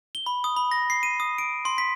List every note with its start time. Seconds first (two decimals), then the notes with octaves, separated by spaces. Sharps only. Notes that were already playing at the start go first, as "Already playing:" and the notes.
0.15 G7
0.26 B5
0.44 D#6
0.56 B5
0.71 A#6
0.90 C7
1.03 D#7
1.20 D#6
1.38 D7
1.65 C6
1.78 B6